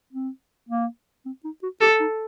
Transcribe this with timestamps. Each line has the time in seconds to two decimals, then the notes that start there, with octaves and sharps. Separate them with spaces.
0.13 C4
0.69 A#3
1.25 C4
1.44 D#4
1.63 F#4
1.81 G4 A4
2.00 D#4